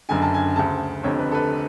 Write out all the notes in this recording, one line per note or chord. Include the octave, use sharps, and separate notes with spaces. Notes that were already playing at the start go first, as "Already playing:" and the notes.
F#1 F#2 D3 G#5
A5
G#5
D2 C#3 A5
F1 F2 D3 C#5
B4
A4
B4